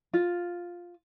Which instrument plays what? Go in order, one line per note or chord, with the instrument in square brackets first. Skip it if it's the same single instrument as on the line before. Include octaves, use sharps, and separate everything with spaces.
[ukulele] F4